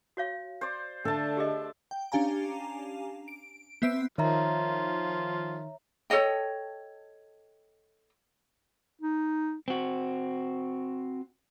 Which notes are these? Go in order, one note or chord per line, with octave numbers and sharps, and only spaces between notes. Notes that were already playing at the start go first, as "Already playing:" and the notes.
F#4 C#5 F5
C5 D5
D3 A3 D4 A4 A5
G4 G#4 D#5
G5
C#4 D4 G4 F5 G#5 A#5
D7
B3 C4 E5 E6 C7 D7
D#3 F3 F4 C#5 E5 A#5
A4 C#5 D#5 G5
D#4
C4 F#4